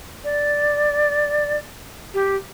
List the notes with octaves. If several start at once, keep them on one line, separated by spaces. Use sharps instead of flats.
D5
G4